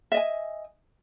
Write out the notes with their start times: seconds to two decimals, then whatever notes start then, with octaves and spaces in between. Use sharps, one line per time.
0.12 E5
0.14 D#5
0.17 G#5